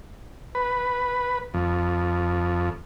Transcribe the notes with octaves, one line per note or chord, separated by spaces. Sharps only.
B4
F2